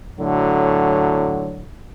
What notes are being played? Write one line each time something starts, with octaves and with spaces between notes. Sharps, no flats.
A2 D3 F#3